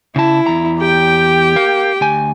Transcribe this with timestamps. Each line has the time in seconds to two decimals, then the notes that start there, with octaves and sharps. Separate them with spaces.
0.16 C#3 E4 A5
0.47 E2 A#5
0.79 G4 G5
1.56 A#4 F5
2.01 D2 G#5